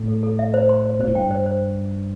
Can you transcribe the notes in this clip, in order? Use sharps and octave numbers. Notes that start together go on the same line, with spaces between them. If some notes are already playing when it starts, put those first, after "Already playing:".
Already playing: A2
A4
A4
E5
C5
C6
C5
B2 C5
A2
G2 G5
C5
C5